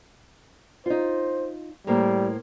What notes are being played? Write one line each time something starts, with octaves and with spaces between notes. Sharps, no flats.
D#4 F4 C5
A2 G3 A#3 C5